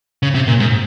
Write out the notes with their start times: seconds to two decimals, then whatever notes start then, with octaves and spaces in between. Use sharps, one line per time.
0.23 C#3
0.35 C3
0.47 A#2
0.60 G#2